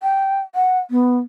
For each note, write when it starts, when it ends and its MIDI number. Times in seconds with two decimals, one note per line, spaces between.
0.02 0.39 79
0.55 0.79 78
0.91 1.18 59